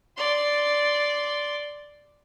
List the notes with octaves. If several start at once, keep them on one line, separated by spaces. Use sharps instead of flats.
D5 C6